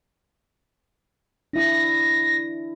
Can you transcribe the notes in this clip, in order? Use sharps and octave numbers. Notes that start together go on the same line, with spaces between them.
D4 E4 A#6